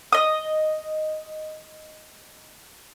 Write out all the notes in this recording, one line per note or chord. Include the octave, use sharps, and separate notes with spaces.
D#5 D#6